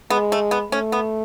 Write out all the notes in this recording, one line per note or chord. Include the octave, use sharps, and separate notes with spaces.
G#3 B3
A3
B3
A3 C#4
B3